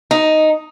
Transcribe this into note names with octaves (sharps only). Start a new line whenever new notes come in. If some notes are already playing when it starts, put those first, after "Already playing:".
D#4